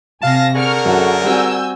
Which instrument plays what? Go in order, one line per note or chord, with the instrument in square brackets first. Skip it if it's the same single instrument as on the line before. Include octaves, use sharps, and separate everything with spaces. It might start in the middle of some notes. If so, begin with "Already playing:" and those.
[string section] C3 G#5 A#6 [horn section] F5 A5
[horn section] D3 G#4 A#4 [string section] C#6 F6
[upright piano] F#2 [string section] F#4 A4
[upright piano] G3 C4 F#4 [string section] G#5 E6 G6